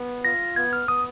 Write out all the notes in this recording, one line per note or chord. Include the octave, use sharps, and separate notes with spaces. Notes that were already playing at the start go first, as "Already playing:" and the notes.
Already playing: B3
F4 A#6
B3 G#6
F6
B3 D#6